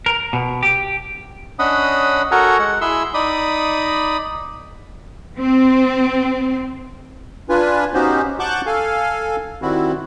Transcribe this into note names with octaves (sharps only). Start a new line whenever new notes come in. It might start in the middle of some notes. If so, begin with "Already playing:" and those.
A#4
B2
G4
C#4 D4 D#5 F#5 B5 D#6
F#4 A4 A#4 F#5 G#5 A#5
G#3 F#5
E4 G#4 E5 C6 E6
D#4 D5 B5 D#6
C4
D4 F4 B4 G#5
B3 C#4 D#4 F#4 G4 C5
F#5 A5 C#6 D6 F#6 G6
A4 F5 G#5
D#3 G3 C4 E4 F#4